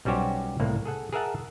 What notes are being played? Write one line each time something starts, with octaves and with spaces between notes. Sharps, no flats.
B1 G3 C#4 F#4 G4 C5
C2 A2 A#3
G#4 A4 F#5
G#4 A#4 E5 F#5 A5